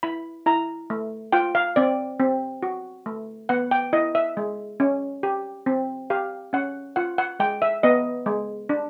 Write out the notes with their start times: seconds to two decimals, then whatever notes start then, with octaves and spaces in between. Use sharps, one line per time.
0.03 E4 B5
0.46 E4 A#5
0.90 A3
1.32 F4 G5
1.55 F5
1.76 C4 D5
2.19 C4
2.63 F#4
3.06 A3
3.49 B3 F#5
3.71 G5
3.93 E4 D#5
4.15 E5
4.37 G#3
4.80 C#4
5.23 G4
5.66 C4
6.10 G4 F5
6.53 C#4 F#5
6.96 F4 F#5
7.18 F#5
7.40 G#3 G5
7.62 E5
7.83 B3 D#5
8.26 G#3
8.69 D4